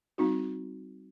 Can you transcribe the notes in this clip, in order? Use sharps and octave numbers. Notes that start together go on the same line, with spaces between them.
G3 C4 D#4 F#4